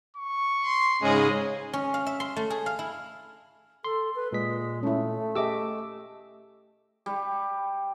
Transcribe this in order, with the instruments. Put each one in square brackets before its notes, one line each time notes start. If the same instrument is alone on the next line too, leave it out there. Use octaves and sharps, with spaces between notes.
[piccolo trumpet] C#6
[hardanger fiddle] C6
[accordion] G#2 C#3 C#4 [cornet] G#3 [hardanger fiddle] G#4 D#5
[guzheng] C#4
F5
E5
C6
A3
G#4
F5
E4
[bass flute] A4 [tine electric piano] C6
[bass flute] B4
[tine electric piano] A#2 B6 [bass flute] G#3
[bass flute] A3 [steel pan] C#4 E4
[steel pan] G4 G#4 E5 [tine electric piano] D#5 D6 E6
[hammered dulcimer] G3